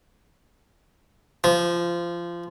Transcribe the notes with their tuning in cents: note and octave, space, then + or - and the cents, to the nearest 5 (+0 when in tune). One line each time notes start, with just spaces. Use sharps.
F3 -20